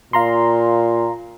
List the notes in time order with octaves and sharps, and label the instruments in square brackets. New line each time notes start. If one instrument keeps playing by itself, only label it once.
[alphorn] A#2 [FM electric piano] F5 A#5 C6